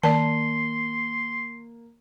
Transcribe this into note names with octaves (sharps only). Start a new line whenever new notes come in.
D#3 A#3 D5 A5 C6